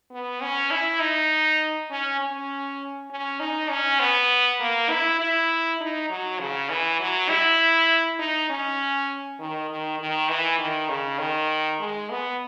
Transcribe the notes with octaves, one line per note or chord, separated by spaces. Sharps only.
B3
C#4
E4
D#4
C#4
C#4
C#4
D#4
C#4
B3
A#3
E4
E4
D#4
F#3
C#3
E3
F#3
E4
D#4
C#4
D#3
D#3
D#3
E3
D#3
C#3
D#3
G#3
B3